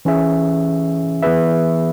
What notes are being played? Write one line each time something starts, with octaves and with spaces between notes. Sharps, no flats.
E3 C#4 G#4 E5
E3 B3 G#4 B4 E5